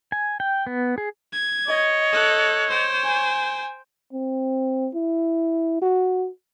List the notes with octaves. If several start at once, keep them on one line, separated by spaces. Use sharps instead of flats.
G#5
G5
B3
G#4
G#6
C#5 D#5
A4 F#6
C5 G5
G#5
C4
E4
F#4